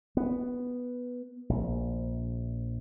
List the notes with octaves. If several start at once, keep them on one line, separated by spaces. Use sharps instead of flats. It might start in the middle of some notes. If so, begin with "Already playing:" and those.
B3
A#1